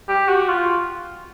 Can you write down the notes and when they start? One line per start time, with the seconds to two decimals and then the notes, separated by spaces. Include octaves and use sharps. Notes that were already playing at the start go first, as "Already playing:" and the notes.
0.09 G4
0.29 F#4
0.48 F4